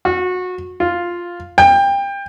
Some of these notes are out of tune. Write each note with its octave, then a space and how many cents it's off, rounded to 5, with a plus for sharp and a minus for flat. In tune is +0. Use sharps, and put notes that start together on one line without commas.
F#4 -25
F4 +0
G5 +25